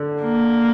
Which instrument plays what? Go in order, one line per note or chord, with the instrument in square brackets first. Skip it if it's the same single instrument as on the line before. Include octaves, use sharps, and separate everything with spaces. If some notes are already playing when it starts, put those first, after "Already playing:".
Already playing: [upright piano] D3
[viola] A#3